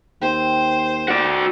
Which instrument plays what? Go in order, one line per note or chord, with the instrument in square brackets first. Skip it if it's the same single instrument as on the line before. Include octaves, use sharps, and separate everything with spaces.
[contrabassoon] D#2 [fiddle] C5 [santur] G5 C6 E6
[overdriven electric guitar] F#4 D5